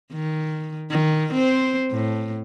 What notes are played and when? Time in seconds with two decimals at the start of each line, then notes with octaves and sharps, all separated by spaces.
0.12 D#3
0.91 D#3
1.34 C4 C5
1.91 A2